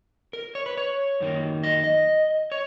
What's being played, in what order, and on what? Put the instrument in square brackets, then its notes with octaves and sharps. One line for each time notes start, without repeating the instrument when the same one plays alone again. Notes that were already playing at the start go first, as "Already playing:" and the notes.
[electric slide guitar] A#4
C#5
B4
C#5
F#2 D#3 A#3
D#5
D#5
C#5